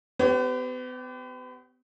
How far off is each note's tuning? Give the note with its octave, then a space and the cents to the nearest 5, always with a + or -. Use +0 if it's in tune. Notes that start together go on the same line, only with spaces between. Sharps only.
B3 +40 G4 -15 C#5 +0